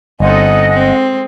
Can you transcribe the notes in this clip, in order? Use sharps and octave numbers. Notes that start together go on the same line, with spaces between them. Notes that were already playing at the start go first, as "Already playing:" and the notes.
G1 C4 D#4 A4 C5 D#5 F#5 G#5
G#3 C4